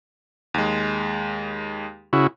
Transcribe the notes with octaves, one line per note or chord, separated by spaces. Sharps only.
D#2 G#3
C#3 E4 F#4